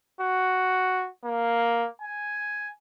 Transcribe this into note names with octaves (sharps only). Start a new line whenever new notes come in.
F#4
A#3
G#5